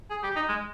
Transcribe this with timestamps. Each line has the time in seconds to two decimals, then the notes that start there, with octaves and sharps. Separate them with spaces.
0.10 G#4
0.23 G4
0.36 D#4
0.48 G#3